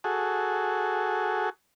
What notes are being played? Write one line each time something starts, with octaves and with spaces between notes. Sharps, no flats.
F#4 G#4 A4